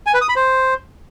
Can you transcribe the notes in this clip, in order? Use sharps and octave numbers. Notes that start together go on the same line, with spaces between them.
G#5
B4
D#6
B5
C5